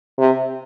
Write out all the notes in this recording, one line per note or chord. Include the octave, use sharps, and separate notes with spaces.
C3